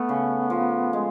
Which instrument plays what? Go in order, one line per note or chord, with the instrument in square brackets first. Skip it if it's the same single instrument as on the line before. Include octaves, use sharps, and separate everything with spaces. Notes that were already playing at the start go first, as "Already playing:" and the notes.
Already playing: [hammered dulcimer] A3 [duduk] B3
[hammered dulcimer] C#3
F3
G#3